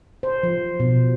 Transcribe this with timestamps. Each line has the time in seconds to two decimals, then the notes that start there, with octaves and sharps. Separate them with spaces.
0.23 C5
0.43 F3
0.80 B2